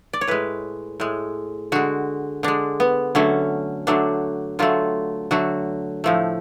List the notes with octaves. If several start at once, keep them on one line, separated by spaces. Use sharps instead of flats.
D5
C#5
A2 G#3 B4
A2 G#3
D3 G#3 F#4
D3 G#3 D4
B3
D3 F#3 A3 C#4
D3 F#3 A3 D4
D3 F#3 A3 F4
D3 F#3 A3 F#4
A2 F3 A3